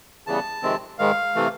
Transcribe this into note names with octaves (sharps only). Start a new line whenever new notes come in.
C#3 E3 G3 B3 A5
F2 C3 D#3 G#3 C4
G#2 D#3 G#3 F5
C3 E3 A3